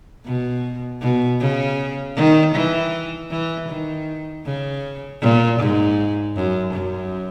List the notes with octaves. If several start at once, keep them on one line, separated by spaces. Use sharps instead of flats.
B2
B2
C#3
D#3
E3
E3
D#3
C#3
A#2
G#2
F#2
F#2